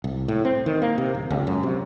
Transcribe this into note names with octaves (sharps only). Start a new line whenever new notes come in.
C2
A2
C4
D#3
A#3
C3
D1
C#2
F#2
C3